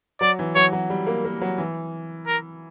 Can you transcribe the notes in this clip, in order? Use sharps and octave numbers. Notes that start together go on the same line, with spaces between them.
F#3 D5
E3
F#3 C#5
F#3
G3
A#3
A#3
F#3
E3
A#4